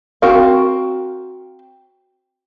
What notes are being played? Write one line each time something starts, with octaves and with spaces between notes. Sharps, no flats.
C4 F#4 A#4 F5